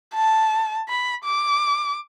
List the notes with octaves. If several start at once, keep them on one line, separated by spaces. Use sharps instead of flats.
A5
B5
D6